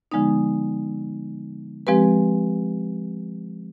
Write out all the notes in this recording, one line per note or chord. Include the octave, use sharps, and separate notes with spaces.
D3 F3 G#3 B3 D#4
F3 G#3 C4 G4 B4